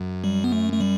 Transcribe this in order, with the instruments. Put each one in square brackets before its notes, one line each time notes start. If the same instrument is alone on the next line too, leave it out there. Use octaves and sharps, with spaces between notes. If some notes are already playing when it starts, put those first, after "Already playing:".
Already playing: [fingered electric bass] F#2
[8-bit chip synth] G3
B3
A3
A3
G3